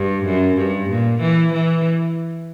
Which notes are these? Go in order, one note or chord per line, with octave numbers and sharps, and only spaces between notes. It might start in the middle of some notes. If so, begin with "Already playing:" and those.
Already playing: G2
F#2
G2
A#2
E3
E3